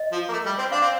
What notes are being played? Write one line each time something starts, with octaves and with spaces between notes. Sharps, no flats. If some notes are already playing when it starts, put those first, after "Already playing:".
Already playing: D#5
F3
A#3
A3
G3
C4
D4 F5
C4